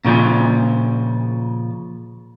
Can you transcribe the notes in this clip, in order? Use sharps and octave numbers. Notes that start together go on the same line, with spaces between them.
A#2 C#3 F3